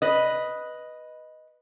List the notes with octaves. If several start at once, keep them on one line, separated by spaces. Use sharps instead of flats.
B4 D#5